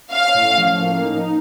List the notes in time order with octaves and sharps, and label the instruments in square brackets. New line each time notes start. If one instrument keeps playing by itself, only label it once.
[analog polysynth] C#4 [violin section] F5
[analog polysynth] A2
F3
A#3
D#4